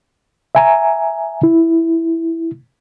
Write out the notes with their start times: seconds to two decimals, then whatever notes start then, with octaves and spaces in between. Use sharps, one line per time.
0.55 E5 G#5 A#5
1.43 E4